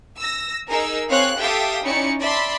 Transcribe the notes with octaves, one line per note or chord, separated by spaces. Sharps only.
E6 A#6
D#4 G#4 A#4 E6
C4 G#4 C#5 F5 F#6
G4 A4 E5 F5 G5 D#6
C#4 D#4 E4 D5 C#7
D5 E5 A5 B5 C6